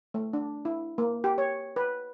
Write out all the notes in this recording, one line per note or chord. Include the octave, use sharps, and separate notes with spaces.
A3
D4
E4
A#3
G4
C#5
B4